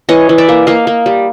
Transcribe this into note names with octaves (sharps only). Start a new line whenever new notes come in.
E3 C#5 D#5
E3
D5 E5
A#3
A#3 D#5 F5
A#3
G3